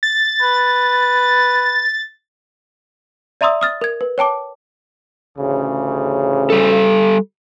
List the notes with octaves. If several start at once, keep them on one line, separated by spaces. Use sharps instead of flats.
A6
B4
D5 E5 A#5 C6 D#6 E6
D#6 F6 A6
A#4 G#6
B4
C#5 G5 A5 D6
A1 D2 C#3
G3 A4